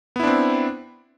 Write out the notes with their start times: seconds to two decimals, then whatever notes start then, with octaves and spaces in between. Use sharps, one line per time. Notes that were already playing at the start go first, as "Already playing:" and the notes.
0.16 B3
0.20 E4
0.23 D4
0.27 C4